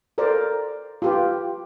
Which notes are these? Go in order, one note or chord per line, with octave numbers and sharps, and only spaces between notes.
A4 A#4 C5 D5
F4 G4 B4